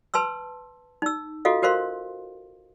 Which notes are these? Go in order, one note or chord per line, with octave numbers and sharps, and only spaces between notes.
B4 A5 C6 E6
D#4 E6
F4 F#4 A4 D#5 F5
F#4 A#4 C5 F5 C6